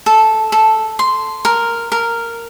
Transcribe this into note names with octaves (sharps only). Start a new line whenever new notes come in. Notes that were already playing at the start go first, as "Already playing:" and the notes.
A4
A4
C6
A#4
A#4